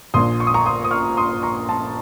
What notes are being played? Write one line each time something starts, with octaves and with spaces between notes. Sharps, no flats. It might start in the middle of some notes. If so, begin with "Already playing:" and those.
A#1 A#2 C6 D#6
C#6
D#6
A#5 C#6
C6 D#6
D#6
C#6 F6
C6 D#6
A#5 C#6
A5 C6